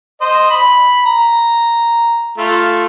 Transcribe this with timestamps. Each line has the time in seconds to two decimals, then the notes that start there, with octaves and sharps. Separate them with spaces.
0.21 C5 D#5
0.50 B5
1.06 A#5
2.38 A3 F4